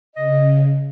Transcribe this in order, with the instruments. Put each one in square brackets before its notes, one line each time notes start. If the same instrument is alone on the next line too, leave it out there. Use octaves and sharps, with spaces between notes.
[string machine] C#3 [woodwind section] D#5